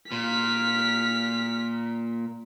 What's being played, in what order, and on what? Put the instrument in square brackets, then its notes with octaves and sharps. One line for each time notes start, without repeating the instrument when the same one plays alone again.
[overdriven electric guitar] A#2 [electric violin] F6 B6